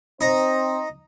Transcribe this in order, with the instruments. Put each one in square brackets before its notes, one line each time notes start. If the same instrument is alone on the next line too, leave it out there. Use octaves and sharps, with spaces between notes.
[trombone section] C4 C5 [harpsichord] D#4 A#5